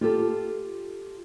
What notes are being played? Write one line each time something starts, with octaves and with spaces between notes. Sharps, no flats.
F4 G4 A4